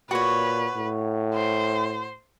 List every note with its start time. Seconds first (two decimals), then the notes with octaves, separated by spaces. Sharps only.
0.11 A#2 F#4 B4 C#5
0.76 A2
1.34 C5